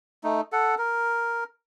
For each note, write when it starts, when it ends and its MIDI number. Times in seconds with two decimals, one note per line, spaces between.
0.24 0.41 57
0.24 0.41 63
0.52 0.75 69
0.52 0.75 78
0.78 1.44 70